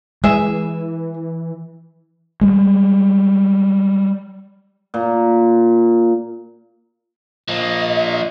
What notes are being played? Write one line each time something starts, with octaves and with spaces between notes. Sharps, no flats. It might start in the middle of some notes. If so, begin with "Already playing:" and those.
E3 G#3 G#4 E5
G3 G#3
A#2
F3 A#3 D#5